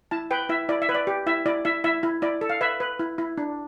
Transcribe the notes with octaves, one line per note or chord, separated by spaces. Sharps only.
E4 A5
B4 G5
E4 E5
E4 D5
E5
B4
D5
G4
E4 E5
E4 D5
E4 E5
E4 E5
E4
E4 D5
A4
F5
B4 E5
B4
E4
E4
D4